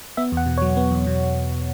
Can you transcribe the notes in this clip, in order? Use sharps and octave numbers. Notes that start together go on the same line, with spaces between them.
B3 E5
E2 F#5
B2
C#5
F#3
B3
E2
B2